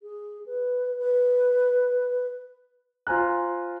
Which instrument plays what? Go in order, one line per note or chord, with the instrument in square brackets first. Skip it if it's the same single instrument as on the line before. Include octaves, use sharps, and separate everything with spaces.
[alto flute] G#4
B4
B4
[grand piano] F4 C5 G#5 A#5 F#6